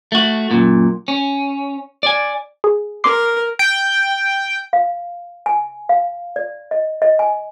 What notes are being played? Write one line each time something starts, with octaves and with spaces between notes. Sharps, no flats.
A3 F#4
F#2 A#2
C#4
D5 G#5
G#4
A#4 C6 D6 C7
G5
F5
G#5
F5
D5
D#5
D#5
G#5